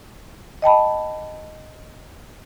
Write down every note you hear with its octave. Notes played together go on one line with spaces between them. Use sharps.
D#5 G5 A5 B5